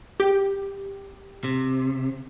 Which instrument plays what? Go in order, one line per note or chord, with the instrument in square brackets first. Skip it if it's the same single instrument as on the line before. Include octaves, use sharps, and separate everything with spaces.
[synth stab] G4
[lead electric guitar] C3